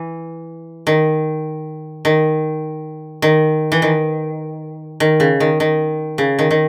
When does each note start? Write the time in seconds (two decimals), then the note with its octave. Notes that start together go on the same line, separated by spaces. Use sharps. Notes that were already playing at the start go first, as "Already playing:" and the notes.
Already playing: E3
0.87 D#3
2.05 D#3
3.22 D#3
3.72 E3
3.82 D#3
5.00 D#3
5.20 C#3
5.40 D#3
5.60 D#3
6.18 C#3
6.39 D#3
6.51 D#3